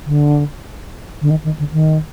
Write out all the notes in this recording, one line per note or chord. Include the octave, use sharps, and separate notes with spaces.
D3
D3
D#3
D#3
D3
D#3